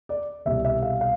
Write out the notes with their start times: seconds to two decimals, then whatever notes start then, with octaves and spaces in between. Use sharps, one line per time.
0.09 D5
0.46 C2 B2 G3 E5
0.65 E5
0.82 F5
1.01 F5